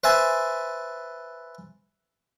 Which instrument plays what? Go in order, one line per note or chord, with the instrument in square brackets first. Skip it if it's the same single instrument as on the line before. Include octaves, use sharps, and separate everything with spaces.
[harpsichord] B4 C5 E5 G#5 A5